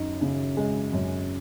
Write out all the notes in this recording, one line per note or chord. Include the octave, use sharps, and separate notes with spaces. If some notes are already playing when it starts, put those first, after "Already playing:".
Already playing: F#2 D#4
C#3
G#3
F#2